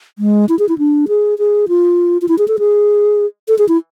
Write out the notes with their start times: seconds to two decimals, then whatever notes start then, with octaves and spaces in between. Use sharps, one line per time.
0.19 G#3
0.49 E4
0.59 G#4
0.69 E4
0.78 D4
1.08 G#4
1.39 G#4
1.68 F4
2.22 F4
2.28 E4
2.38 G#4
2.48 A4
2.59 G#4
3.48 A4
3.58 G#4
3.68 E4